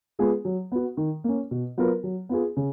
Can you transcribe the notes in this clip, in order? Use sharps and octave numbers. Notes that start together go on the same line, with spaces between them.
G#3 B3 F4 G#4
F#3
B3 F#4
D#3
A#3 C#4
B2
F#3 B3 F4 A#4
F#3
B3 F4 G#4
C#3